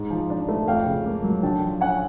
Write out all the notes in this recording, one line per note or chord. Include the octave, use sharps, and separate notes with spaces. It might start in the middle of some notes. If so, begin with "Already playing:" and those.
Already playing: G#2
F3
D4
A3
F2 F5 G5
C#3
A#3
F#3
D3 G5 A5
F3
C#4 F#5 G#5